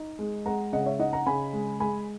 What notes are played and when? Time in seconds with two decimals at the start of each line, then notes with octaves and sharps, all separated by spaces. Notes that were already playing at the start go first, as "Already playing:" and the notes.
Already playing: D#4
0.19 G#3
0.46 G#3 F#5 A#5
0.73 C#3 D#5 F#5
0.86 C#5 E5
0.99 D#4 D#5 F#5
1.13 F#5 A#5
1.26 C#3 G#5 B5
1.53 G#3
1.80 G#3 G#5 B5